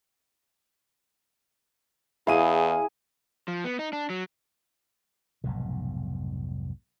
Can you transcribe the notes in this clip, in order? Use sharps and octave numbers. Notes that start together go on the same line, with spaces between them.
E2 E4 G#4 F5 D#7
F3
B3
D#4
D4
F#3
F1 B1 G#2 B2